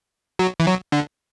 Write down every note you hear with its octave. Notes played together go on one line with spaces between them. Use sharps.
F#3
E3
F#3
D3